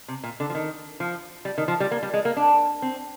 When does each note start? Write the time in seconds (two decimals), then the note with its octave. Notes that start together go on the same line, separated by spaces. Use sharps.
0.08 C3
0.24 A#2
0.40 D3
0.50 F3
0.55 D#3
1.00 F3
1.45 G3
1.58 D#3
1.68 F3
1.80 G3
1.91 A#3
2.03 G3
2.14 G#3
2.25 A#3
2.37 D4
2.82 C4